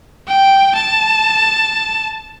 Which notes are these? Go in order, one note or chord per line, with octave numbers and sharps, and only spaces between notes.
G5
A5